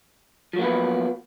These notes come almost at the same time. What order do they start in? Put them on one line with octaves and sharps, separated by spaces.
F3 F#3 A#3 B3 B4